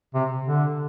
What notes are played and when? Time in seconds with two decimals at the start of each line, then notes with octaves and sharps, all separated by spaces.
0.15 C3
0.46 D3